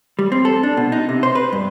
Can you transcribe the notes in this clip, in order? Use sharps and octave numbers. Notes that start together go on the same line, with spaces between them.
G3
C4
A4
D4
B2
D#4
C3
C5
B4
G2